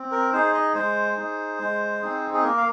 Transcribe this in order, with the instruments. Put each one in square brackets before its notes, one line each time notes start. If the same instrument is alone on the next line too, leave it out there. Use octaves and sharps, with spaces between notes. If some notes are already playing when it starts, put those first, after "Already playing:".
Already playing: [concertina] C4
A#4
D#4 G#4 C5
D#5
G#3 C5
D#4 G#4
G#3
C4 D#4 G#4
G#4
A#3 A#4
F5